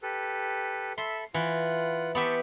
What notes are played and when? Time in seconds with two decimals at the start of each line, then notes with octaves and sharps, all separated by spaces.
0.03 G4 A4 B4
0.98 A4 E5 B5 C6
1.34 E3 F4 F#5
2.15 B3 G4 E5 A5 C6 C#6